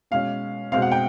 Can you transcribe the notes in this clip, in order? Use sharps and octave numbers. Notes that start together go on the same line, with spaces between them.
B2 G#3 C#4 F5
B2 G#3 C4 F5
F#5
G5